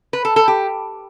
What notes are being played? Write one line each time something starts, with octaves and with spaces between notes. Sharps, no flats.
B4
A4
A4
G4